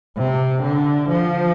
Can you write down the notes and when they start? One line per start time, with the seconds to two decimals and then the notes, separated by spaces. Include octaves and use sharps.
0.17 C3
0.63 D3
1.09 F3